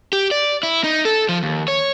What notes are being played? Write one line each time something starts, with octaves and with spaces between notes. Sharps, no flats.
G4
D5
E4
D#4
A4
F3
D#2
C#5